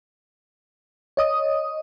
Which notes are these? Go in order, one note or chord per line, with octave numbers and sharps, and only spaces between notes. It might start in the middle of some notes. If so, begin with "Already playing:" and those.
C#5 D#5 D#6